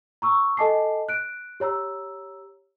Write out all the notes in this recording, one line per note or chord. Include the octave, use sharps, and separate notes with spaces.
A#5 C#6 E6
A4 D#5 G#5 A5 D6 C7
F#6 D7
G4 C#5 A#5 E6